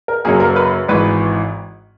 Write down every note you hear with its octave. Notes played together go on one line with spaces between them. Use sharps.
A#4
F#2 C#3 F#3 A#3 G#4
A#4
A#4
B4
G#1 G#2 E3 B4